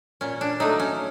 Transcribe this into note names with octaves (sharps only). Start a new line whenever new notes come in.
A#2 C#4
D4
F#3 A3 D#4
C#4